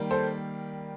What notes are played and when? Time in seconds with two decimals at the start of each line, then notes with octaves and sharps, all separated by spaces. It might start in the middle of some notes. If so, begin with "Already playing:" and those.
Already playing: D#3 G3 A#3
0.11 A4 C5